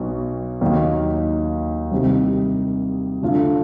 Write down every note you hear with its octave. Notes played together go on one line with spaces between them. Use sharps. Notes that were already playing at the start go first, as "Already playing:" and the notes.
Already playing: B1 B2 F#3
D#2 D#3 F#3 A#3
C2 C3 D#3 G3
D3 F#3 A3 D4 F4